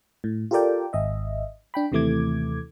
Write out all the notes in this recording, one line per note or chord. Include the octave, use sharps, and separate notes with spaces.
A2
F4 G4 A4 A#4 D5 G5
G#1 D#5 E5
D4 G5 B5
D#2 C3 E3 A3 D6 G#6